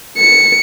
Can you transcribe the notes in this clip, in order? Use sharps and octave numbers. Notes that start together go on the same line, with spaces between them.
C#7